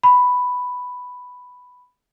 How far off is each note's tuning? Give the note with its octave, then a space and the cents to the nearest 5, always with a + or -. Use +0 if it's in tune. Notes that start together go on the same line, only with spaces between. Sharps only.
B5 +5